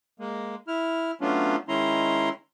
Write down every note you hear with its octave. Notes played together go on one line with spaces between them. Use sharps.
G#3 A#3
E4 F6
F#3 A3 B3 C#4 D4 F4
D#3 G#3 C#4 E4 A#5 C6